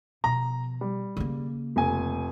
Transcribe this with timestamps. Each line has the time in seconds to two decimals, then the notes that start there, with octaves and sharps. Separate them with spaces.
0.24 B2 F3 A#5
0.81 G3
1.17 C#3 A#3
1.76 F1 G#5